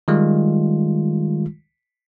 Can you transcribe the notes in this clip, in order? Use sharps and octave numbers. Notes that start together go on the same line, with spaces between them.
D#3 G3 G#3 F4